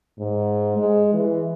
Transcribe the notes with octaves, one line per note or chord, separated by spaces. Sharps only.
G#2
G#3
E3